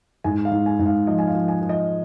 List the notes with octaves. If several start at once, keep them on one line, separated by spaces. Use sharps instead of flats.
G#2 G#5
F5
G#2
G#5
G#2
F5
F3 D#5
G#5
F5
F3
G#5
F3
D#5